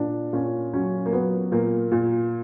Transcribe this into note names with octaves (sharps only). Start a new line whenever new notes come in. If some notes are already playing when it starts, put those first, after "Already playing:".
Already playing: A#2 D4
A#2 C#4
F#3 C#4
A#3
F#3 B3
A#2 A#3
A#2